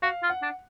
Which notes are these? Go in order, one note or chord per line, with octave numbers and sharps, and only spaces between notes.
F#4 F5
F4
F#5
D4